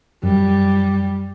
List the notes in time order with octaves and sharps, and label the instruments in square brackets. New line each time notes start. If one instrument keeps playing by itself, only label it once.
[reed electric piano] F#2 [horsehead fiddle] G3